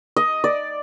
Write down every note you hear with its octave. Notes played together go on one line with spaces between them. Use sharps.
D#5
D5